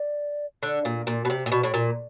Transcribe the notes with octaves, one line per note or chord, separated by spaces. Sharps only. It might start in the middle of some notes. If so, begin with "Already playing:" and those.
Already playing: D5
D3
A#2
A#2
B2
C3
A#2
B2
A2
A#2